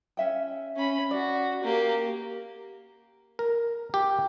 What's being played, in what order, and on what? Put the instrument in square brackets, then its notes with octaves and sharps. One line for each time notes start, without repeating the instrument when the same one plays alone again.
[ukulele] C#4 E5 G5
[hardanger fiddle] C#4 B5
[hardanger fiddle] F#4 [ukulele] D5
[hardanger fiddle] A#3 G4
[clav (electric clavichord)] A#4
G4